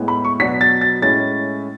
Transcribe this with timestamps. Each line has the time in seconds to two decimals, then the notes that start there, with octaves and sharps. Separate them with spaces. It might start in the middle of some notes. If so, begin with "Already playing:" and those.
Already playing: A2 G#3 B3 E4
0.08 B5
0.25 C#6
0.39 B2 F#3 B3 D4 B6
0.61 A6
0.81 A6
1.01 A2 G#3 C#4 E4 A6